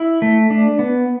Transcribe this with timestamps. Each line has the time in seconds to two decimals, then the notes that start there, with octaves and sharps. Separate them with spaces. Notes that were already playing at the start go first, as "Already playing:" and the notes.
Already playing: E4
0.22 A3
0.50 D4
0.79 B3